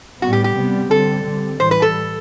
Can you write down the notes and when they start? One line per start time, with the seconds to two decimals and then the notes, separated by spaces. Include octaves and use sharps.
0.22 A2 G3 B3 F#4
0.33 G4
0.44 G4
0.56 C3 G3 B3
0.90 D3 G3 C4 A4
1.25 D3 G3 C4
1.59 A2 E3 G3 C5
1.71 B4
1.82 A4